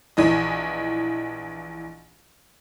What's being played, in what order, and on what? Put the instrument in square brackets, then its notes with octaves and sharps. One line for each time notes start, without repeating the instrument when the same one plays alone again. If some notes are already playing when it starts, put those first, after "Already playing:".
[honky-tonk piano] A#1 E3 D#5